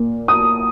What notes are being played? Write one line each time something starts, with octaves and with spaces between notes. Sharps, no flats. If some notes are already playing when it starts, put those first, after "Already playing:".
Already playing: A#2 A#3
D#6